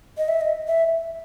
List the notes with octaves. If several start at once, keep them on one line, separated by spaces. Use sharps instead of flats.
D#5
E5
D#5
E5